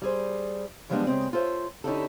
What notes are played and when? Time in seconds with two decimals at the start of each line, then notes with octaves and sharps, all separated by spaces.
0.02 G3 G#4 C5
0.90 E3 F3 G3 G#3 B3 D4
1.07 C#3 G#3 C4
1.33 F4 A4 C5 C#5 E5
1.84 D3 C#4 D#4 E4 G4 A4